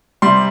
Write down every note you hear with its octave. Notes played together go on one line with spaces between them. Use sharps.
C3 G3 C6